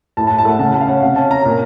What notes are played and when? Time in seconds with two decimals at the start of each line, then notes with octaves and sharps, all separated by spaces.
0.17 A2 A5
0.27 A5
0.31 A2
0.38 A5
0.45 A3 F#5
0.59 C#3 A5
0.74 A3 A5
0.81 F5
0.87 C#4 F#5
1.02 C3 F5
1.16 C#4 A5
1.30 C#4 A#5
1.45 A#2